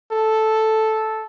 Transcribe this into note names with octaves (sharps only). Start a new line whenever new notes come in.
A4